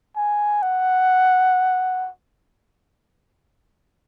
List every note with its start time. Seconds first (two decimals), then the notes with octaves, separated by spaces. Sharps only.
0.16 G#5
0.62 F#5